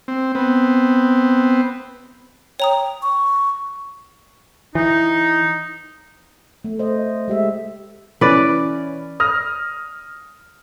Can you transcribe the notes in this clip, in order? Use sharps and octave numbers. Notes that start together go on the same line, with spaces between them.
C4
B3 C4
C#5 G5 A#5 D#6
C#6
E3 D#4
A3
C5 D#5
G#3 G4 E5
E3 C#4 B4 D5
D#6 F6 A#6